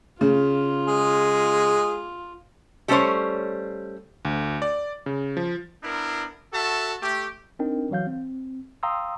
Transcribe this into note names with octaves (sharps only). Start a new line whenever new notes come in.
C#3 F4
G#3 G#4
G3 A3 C#4 G#4 C5 C#5
D2
D5
C#3
F3
B3 D4 E4 A#4
F#4 A4 E5 A5
A3 G4
C4 D4 D#4 A#4 G5
E3 F#3 F5 G6
C4
F5 G5 A#5 C6 D#6 E6